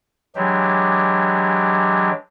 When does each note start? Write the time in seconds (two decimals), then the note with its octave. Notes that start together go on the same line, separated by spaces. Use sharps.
0.35 E3 F#3 G#3 D4 G4